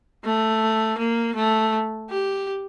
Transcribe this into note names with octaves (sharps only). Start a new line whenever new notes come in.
A3
A#3
A3
G4